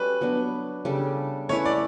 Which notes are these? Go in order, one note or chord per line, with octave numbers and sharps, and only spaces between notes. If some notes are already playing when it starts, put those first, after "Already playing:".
Already playing: G3 C#4 F#4 A4 B4
F#3 B3 D4
C#3 G3 D4 A4
A3 C#4 E4 B4 C#5
D5